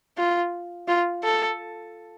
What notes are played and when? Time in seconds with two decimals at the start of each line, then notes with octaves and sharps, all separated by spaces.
0.18 F4
0.88 F4
1.24 A4